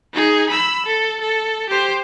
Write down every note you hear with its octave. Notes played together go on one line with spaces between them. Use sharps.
D#4 G#4
B5 E6
A4
A4
G4 C5